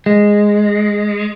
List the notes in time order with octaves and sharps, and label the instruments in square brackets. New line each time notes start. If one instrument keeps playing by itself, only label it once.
[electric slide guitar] G#3